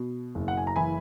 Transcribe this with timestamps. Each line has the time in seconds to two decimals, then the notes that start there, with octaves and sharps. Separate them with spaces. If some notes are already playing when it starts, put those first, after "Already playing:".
Already playing: B2
0.35 F#1
0.48 F#5
0.57 G#5
0.67 A#5
0.76 E3 G#5 B5